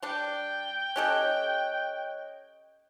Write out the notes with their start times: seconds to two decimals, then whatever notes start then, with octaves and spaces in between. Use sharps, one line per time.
0.02 G3 D4 G5
0.96 C#4 G4 A4 C#5 D#5 F#6